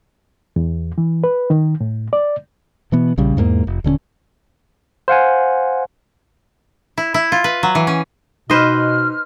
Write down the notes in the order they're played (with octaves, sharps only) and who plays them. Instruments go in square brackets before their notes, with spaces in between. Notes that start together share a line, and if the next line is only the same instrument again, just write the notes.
[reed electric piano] E2
E3
B4
D#3
A2
D5
[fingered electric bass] B2 E3 B3
A#1 C#3 G3
E2 G#2 G3 A#3
F1
D#1 D3 C4 C#4
[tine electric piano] C5 F5 F#5 G#5
[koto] E4
E4
F4
B4
F#3
E3
C#4
[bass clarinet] B2 [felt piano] D#4 [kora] B4 C5 D#5 [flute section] F6